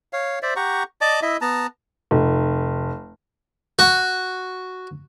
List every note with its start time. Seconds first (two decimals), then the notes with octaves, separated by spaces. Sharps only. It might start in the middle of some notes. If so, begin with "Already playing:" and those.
0.13 C#5 F5
0.42 C5 D5 E5
0.56 G4 F#5 A#5 C#6
1.01 D5 D#5 A5 D6
1.22 E4 D#5 E5
1.41 B3 A5 A#5
2.11 F1
3.79 F#4